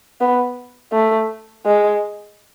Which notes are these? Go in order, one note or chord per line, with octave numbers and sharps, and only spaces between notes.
B3
A3
G#3